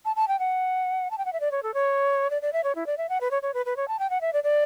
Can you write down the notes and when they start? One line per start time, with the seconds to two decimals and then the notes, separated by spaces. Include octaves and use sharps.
0.05 A5
0.16 A5
0.28 G5
0.39 F#5
1.11 A5
1.18 G5
1.25 F#5
1.33 E5
1.40 D5
1.51 C#5
1.63 A4
1.74 C#5
2.30 D5
2.42 D5
2.53 E5
2.64 C#5
2.75 E4
2.87 D5
2.98 E5
3.09 F#5
3.21 B4
3.31 C#5
3.42 C#5
3.54 B4
3.66 B4
3.77 C#5
3.88 A5
3.99 G5
4.10 F#5
4.21 E5
4.33 D5
4.44 D5